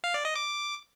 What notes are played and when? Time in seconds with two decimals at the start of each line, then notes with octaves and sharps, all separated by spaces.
0.04 F5
0.14 D5
0.25 D#5
0.36 D6